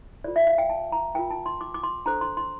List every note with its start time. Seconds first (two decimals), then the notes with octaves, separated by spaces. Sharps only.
0.24 F4 A4 C5 D5
0.36 E5
0.47 F5
0.58 G5
0.69 A5
0.92 A#5
1.15 F4 A#4 G5
1.30 A5
1.46 C6
1.61 D6
1.74 D6
1.84 C6
2.06 D4 A4 C5 A#5
2.21 C6
2.37 C6